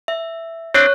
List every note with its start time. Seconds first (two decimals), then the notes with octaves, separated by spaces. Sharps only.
0.08 E5
0.74 C4 D4 C#5 F#6